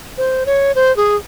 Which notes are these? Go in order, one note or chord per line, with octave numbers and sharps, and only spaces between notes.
C5
C#5
C5
G#4